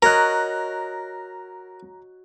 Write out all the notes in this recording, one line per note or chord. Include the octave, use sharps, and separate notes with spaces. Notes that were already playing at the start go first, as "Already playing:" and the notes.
F#4 A#4 C#5 D#5 A#5 F#6